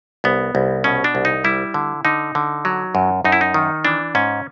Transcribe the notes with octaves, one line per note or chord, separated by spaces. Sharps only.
C2 B3
C2
B2 C#4
D4
C2
D#4
G3 E4
D3
D3 D#4
D3
F#3
F#2
F#2 D#4
E4
D#4
D#3
E3 D4
G#2 C#4